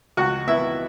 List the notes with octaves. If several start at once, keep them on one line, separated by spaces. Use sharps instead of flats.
C#2 F#4 F#5
B3 E4 E5